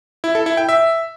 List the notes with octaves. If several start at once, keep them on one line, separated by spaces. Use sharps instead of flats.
E4
A4
E4
G5
E5